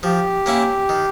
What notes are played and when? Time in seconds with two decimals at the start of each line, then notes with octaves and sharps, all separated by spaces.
0.03 F3 G4
0.46 A#3 C#4 E4
0.89 D#3